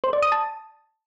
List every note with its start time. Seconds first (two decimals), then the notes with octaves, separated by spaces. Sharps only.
0.04 C5
0.13 D5
0.22 D#6
0.32 A5